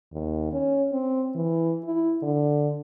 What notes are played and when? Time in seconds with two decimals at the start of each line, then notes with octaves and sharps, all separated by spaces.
0.12 D#2
0.53 C#4
0.92 C4
1.35 E3
1.85 E4
2.22 D3